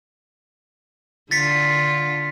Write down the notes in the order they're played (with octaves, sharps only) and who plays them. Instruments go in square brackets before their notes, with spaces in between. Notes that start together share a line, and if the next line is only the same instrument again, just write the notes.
[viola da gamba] D3 F4 [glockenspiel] A6 B6 C#7